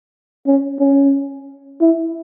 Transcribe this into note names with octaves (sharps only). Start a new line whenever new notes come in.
C#4
C#4
E4